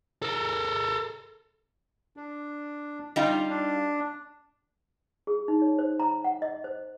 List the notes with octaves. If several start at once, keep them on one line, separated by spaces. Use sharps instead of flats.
A4 A#4
D4
G3 D#4 F4
D4
G#4
D#4
C#5
C5
A#5
F#5
D#5
C5